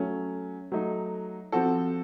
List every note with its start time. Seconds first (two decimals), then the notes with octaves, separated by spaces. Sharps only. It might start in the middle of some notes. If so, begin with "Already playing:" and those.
Already playing: F#3 A3 C#4
0.72 F#3 A3 D#4
1.52 F3 C4 F#4 A4